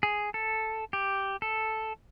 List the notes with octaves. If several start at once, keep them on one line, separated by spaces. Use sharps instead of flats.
G#4
A4
G4
A4